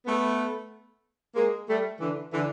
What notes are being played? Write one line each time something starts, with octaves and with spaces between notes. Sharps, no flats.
A3 B3
G#3 A#3
G3 A3
D3 E3
D3 E3